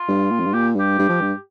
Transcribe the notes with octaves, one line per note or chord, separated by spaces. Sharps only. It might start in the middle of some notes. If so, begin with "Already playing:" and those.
Already playing: F4
G2
A#2
F2
G2
A#2 G4
G2 G4
G2
F3
G2